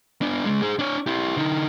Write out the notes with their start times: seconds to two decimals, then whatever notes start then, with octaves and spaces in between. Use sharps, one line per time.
0.21 B3 D4
0.45 C#2 G#3
0.62 G#4 C5
0.79 D4 C#5
1.06 E4 G4
1.37 D3 D#4